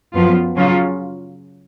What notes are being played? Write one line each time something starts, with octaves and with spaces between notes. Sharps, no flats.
F#2 F3 B3 F4
C#3 F#3 C#4 F4